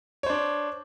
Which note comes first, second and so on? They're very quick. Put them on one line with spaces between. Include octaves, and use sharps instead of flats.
C#5 C5 D4